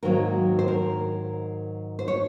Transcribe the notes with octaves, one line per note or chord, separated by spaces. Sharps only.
G#2 D#3 F#3 A#3 A#4
C5
A#4
C5
C#5